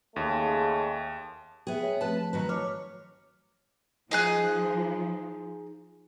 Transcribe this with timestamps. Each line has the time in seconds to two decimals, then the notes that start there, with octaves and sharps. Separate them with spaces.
0.16 D#2 C#3 G#3 A3
1.67 B3 G#4 E5 G5
1.82 B4 C#5 E5
2.01 F3 A3 C4 B4 A5
2.33 D#3 F#3 B4
2.49 C#5 D6 F6
4.11 F3 D#4 G#4 F#6